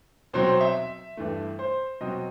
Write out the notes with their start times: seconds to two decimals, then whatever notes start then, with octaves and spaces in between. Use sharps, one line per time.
0.34 B2 F#3 C4 C5
0.48 C5
0.61 E5
1.17 G2 E3 A3
1.59 C5
2.01 B2 F#3 C4 D#5